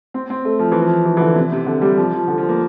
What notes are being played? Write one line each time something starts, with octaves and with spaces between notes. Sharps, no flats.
C4
C4
A3
F3
E3
F3
E3
E3
D3
C3
C3
D3
G3
F3
F3
D3
F3
A#3